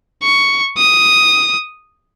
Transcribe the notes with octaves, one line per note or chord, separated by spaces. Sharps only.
C#6
D#6